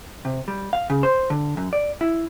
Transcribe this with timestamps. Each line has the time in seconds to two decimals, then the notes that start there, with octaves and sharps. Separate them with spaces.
0.25 C3
0.48 G3
0.73 F5
0.90 C#3
1.03 C5
1.30 D3
1.57 F#2
1.73 D5
2.01 E4